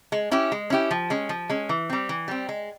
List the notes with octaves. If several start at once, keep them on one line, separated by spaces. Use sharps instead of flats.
G#3
C#4 E4 G4
G#3
C#4 E4 G4
F3
G#3 C#4
F3
G#3 C#4
E3
G3 C4
E3
G3 C4
G#3